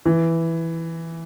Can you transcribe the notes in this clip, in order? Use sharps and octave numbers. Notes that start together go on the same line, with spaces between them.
E3